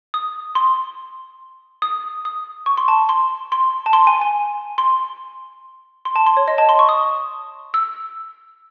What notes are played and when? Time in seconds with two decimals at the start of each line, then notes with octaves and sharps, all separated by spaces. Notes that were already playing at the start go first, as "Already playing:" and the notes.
0.14 D#6
0.55 C6
1.82 D#6
2.25 D#6
2.66 C#6
2.77 C6
2.88 A5
3.09 C6
3.52 C6
3.86 A5
3.93 C6
4.07 G#5
4.21 G#5
4.78 C6
6.05 C6
6.16 A5
6.26 C6
6.37 C#5
6.48 D#5
6.58 A5
6.69 C6
6.79 C#6
6.89 D#6
7.74 E6